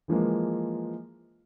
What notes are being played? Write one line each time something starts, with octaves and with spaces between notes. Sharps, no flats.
E3 F3 G#3 A#3